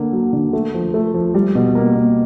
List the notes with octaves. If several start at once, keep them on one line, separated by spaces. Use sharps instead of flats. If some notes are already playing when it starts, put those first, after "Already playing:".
Already playing: D3 A#3
F#3
D3
A3
F3
A3
F3
G3
B2
A#3
B2